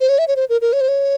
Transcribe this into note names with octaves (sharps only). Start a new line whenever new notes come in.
C5
C#5
E5
C#5
C5
A#4
A#4
C#5
C5
C#5